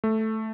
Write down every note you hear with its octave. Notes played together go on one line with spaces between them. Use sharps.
A3